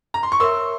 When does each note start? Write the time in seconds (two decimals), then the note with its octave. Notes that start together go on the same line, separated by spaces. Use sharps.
0.14 A#5
0.23 C6
0.32 C#6
0.40 A#4 C#5 E5 C6 E6